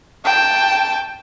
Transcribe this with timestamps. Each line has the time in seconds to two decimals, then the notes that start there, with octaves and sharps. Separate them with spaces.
0.25 G5 A5